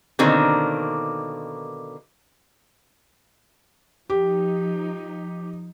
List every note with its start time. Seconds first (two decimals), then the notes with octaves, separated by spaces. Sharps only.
0.19 B2 D3 D#3 A#3 C4
4.10 F3 D#4 G4